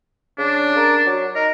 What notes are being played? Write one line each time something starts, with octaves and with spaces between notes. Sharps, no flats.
C#3 D4
A#4
F#3
D#4 A#4